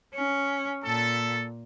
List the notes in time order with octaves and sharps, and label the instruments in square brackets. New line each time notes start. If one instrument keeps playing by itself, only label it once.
[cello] C#4
[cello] A#2 [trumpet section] A4